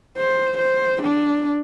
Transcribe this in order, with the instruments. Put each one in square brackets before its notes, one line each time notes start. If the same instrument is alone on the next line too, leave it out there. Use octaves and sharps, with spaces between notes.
[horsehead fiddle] C5
C5
D4